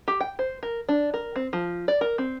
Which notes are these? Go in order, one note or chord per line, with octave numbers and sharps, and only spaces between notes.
G4
G5
C5
A#4
D4
A#4
C4
F3
D5
A#4
C4